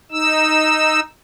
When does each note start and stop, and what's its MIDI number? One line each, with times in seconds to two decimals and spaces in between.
0.12 1.00 63
0.12 1.00 88